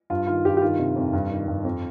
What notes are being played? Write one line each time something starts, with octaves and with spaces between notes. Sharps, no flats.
G2 F4
D#3 F4
G2 G4
G4
D#3 F4
C3
F2
G2
D#3
G2
F2